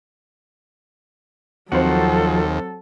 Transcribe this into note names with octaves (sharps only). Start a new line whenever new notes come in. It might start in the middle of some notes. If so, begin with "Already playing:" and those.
D#2 F3 F#3 C4 F#4 A4 C5